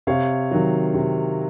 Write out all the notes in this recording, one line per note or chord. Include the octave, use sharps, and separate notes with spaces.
C3 C#5 F5
D#3 F#3
C3